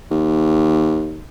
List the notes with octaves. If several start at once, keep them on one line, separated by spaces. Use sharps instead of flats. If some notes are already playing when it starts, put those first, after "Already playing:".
D#2